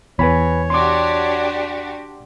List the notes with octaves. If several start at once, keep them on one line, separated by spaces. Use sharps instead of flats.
E2 B4 C#5 G#5 B5
D4 F#4 G4 C6 D6